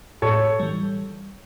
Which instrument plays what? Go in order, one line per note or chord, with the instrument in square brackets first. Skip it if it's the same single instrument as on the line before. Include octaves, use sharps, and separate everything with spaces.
[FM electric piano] A2 [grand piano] A4 C#5
[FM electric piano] E3 G3